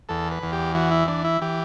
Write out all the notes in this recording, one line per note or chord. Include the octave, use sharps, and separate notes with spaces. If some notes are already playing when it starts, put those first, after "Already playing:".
E2 A4
B4
E2
G4
E3 F#4
E4
E3 D4
E4
E3 G4